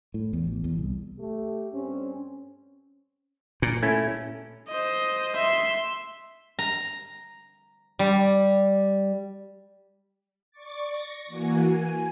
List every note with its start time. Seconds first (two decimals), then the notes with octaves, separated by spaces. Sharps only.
0.14 A2
0.33 E2
0.47 A1
0.64 E2
0.78 C2
1.19 A3 G4
1.73 G2 C4 C#4
3.62 A#2
3.83 A3 C#4 E4
4.68 C5 D#5
5.35 E5 C6
6.59 A#5
7.99 G3
10.51 D5 C#6 D6 A6
10.88 C#6 A#6
11.27 E3 A#3 F#4 G#5
11.63 G#5